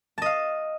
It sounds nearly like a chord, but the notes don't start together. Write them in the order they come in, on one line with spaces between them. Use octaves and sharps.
A5 D#5 F5